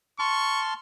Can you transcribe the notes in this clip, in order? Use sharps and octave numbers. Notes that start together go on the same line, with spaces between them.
A5 C6 C#6 F6